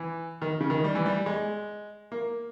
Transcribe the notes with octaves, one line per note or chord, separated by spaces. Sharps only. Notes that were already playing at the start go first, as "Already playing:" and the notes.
Already playing: E3
D#3
C#3
D#3
G3
E3
G3
G#3
A#3